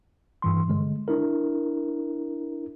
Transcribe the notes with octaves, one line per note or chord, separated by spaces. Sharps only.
G2 E3 C6
D3 G#3
D4 E4 A#4